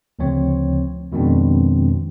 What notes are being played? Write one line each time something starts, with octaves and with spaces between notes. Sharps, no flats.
D2 C#3 F3 C4 C#5
F2 B2 D#3 G#3 C4 D4